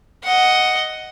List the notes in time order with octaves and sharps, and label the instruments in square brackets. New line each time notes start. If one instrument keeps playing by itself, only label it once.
[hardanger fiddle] D#5 F#5